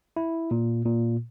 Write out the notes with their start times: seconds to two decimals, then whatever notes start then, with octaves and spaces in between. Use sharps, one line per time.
0.17 E4
0.51 A#2
0.85 A#2